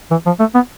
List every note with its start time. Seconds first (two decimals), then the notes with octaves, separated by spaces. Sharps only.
0.11 E3
0.26 F3
0.40 A3
0.54 B3